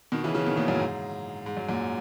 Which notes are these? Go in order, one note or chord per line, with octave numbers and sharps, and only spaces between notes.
B2 D#3
C#3 E3
C#3 E3
B2 D#3
A#2 C#3
F#2 A#2
G#2
G#2
F#2
F#2 A#2